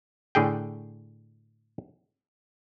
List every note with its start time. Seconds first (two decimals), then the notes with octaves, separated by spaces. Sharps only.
0.35 A2 D3 G#4 G5